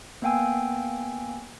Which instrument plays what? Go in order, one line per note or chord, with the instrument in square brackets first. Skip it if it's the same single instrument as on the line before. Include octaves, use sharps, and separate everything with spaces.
[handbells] A#3 B3 F5 G5 G#5 E6